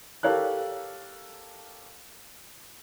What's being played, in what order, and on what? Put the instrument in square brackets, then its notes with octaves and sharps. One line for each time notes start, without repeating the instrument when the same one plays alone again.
[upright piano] G4 A4 A#4 C#5 F5 F#6